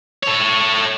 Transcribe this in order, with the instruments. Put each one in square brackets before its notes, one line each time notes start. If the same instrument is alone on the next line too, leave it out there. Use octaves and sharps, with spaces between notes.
[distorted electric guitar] A4 C#5